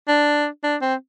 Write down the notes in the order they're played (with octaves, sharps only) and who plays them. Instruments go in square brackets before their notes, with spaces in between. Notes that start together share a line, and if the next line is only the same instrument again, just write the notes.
[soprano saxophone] D4
D4
C4